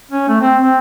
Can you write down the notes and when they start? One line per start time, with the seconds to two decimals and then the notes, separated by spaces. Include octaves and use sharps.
0.12 C#4
0.29 A3
0.41 C4
0.62 C4